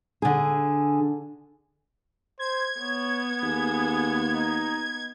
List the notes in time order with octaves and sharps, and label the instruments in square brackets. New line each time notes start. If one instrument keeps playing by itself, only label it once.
[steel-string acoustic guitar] D3 G#4
[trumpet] C5 [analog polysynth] G#6
[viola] B3 [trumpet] C#5
[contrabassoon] D#2 [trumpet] G#4
[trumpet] D#4